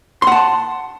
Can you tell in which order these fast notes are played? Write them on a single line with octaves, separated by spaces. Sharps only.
C6 F#5 A5